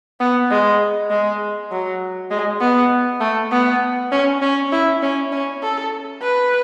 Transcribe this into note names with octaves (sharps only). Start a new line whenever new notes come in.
B3
G#3
G#3
F#3
G#3
B3
A3
B3
C#4
C#4
E4
C#4
C#4
A4
B4